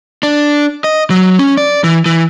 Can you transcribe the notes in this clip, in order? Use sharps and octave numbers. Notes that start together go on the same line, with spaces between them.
D4
D#5
F#3
C#4
D5
E3
E3